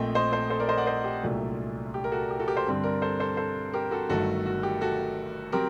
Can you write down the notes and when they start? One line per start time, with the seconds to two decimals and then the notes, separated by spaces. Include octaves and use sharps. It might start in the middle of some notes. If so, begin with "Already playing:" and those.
Already playing: A#1 A#2 A3 C4 D#5 G5
0.15 C5 D#5
0.32 A4 C5
0.50 A4 C5
0.60 A#4 D5
0.69 C5 D#5
0.77 D5 F#5
0.86 C5 D#5
1.04 G4
1.23 C2 A#2 F#3 A3 D4
1.94 G4
2.04 A#4
2.12 F#4 A4
2.30 G4
2.39 F#4 A4
2.48 G4 A#4
2.57 A4 C5
2.66 G2 D3 G3 C4
2.84 A#4 D5
3.02 A4 C5
3.20 A4 C5
3.37 A4 C5
3.73 G4 A#4
3.91 F#4 A4
4.09 G1 G2 D#3 F#3 A3 F#4 A4
4.46 F#4
4.63 G4
4.81 F#4 A4
5.52 F#3 C4 G4 A#4